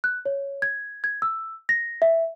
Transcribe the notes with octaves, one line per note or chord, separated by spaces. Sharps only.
F#6
C#5
G#6
G#6
E6
A#6
E5